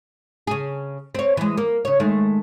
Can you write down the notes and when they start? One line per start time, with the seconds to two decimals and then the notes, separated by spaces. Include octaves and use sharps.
0.47 C#3 G#4
1.15 C4 C#5
1.37 E3 G#3
1.57 A#3
1.85 C#3 C#5
2.00 D#3 G#3 A3